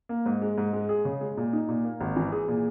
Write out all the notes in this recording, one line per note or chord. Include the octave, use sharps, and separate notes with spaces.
A#3
G#2
G#3
G#2
G#3
G#4
C#3
G#3
A#2
D#4
A#2
A#3
G#1
E3
G#4
A#2